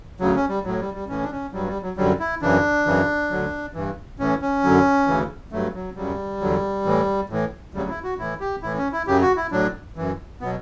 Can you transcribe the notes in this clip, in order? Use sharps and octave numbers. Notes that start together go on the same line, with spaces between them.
D2 C#3 F#3
C#4
G3
A2 F#3
G3
G3
A2 E3 C#4
D4
C#4
G2 F#3 G3
G3
F#3
F#2 D3 F#3 G3
E4
F#2 C#3 E3 D4
F#2 C#3 E3
D2 D3 F#3
G2 E3
A2 E3 C#4
C#4
F#2 D3 F#3
D2 C#3 E3
G2 F#3 A3
F#3
F#2 C#3 F#3 G3
E2 D3 F#3
A2 E3
A2 E3
D2 C#3 F#3 G3
E4
F#4
A2 E3 E4
G4
A2 E3 E4
C#4
E4
F#2 C#3 F#3 G4
F#4
E4
A2 F#3 D4
F#2 E3
B2 F#3 B3